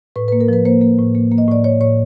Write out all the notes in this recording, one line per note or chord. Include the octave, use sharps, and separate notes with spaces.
A2 B4
A#3 B4
A#4
F3 B4
A#3 C5
A#3
A2
A#3
A#3
D#5
A2 D5
A2 C#5
A2 C#5